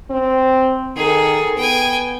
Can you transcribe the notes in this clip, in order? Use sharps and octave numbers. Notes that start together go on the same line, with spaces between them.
C4
D#3 G#4 A4
B3 G5 G#5